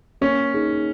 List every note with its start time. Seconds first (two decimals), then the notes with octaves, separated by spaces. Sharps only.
0.21 A#3 C#4
0.54 D#4 G#4